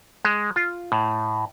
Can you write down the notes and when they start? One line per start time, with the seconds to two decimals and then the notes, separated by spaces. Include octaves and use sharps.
0.25 G#3
0.56 F4
0.92 A2